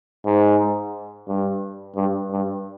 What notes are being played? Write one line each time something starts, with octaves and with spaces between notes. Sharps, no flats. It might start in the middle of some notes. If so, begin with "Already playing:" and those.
G#2
G2
G2
G2